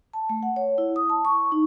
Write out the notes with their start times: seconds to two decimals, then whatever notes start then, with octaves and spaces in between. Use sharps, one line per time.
0.14 A5
0.29 A3
0.43 F#5
0.56 C#5
0.78 E4
0.96 D#6
1.10 A5
1.25 C#6
1.52 D#4